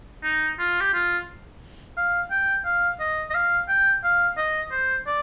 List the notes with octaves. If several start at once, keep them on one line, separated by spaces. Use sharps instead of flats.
D#4
F4
G4
F4
F5
G5
F5
D#5
D#5
F5
G5
F5
D#5
C5
D5